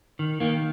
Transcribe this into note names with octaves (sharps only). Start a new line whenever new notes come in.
D#3
D#3 A#3